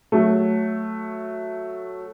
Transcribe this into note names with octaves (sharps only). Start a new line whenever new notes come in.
F#3 A3